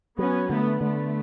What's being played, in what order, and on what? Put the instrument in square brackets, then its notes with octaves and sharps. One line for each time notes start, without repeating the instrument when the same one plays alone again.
[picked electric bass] F#3 [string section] B3 C#4
[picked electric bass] D3 [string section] A3 B3
[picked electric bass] D3 [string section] A3 B3